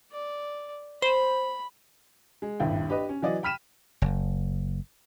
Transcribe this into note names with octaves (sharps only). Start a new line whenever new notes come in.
D5
C5 B5
G#3
D#1 G#1 G2 E4 G5
D4 G4 B4 D#5
C#4
E3 F#3 D5 D#5
G5 B5 F6 B6 D#7 E7
F#1